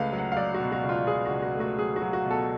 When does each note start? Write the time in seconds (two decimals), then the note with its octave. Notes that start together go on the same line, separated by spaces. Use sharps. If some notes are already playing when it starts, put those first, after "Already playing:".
Already playing: C#2 A3 B4 F5
0.12 F#3
0.18 F#5
0.32 F5
0.37 F#3 D5
0.54 F#4
0.61 B2
0.72 F#4
0.84 C#2
0.89 F4
1.07 C#2 G#4
1.25 F#4
1.31 C#2
1.42 F#4
1.55 A3
1.60 F#4
1.78 F#3 G#4
1.96 F#4
2.02 F#3
2.13 F#4
2.26 B2 A4